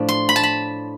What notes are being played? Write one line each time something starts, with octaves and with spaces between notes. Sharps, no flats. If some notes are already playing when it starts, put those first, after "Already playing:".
Already playing: A2 F3 D4
C6
B5
A5
B5